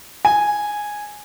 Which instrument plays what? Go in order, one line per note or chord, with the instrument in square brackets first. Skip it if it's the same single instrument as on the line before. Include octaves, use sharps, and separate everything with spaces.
[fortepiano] G#5